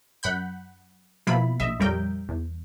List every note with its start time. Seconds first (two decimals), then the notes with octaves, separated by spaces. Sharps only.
0.23 F#2 F#5 B5 G6
1.27 B2 F3 A#3 E4 F4 B5
1.60 A#1 D#5 E5
1.80 F2 G3 A#4 C#5 G5 G6
2.29 E2